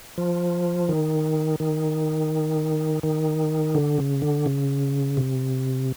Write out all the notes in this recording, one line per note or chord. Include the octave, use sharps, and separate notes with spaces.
F3
D#3
D#3
D#3
D3
C#3
D3
C#3
C3